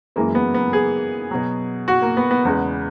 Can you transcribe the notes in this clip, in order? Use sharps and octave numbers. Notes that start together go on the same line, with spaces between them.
F#2 E3 G#3 A#3
B3
B3
G#4
B2 F#3
F#4
A#3
B3
B3
E2 C#3 G#3 B3